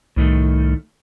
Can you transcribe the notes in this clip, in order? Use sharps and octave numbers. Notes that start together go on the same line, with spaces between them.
C2 A2 D#3 A3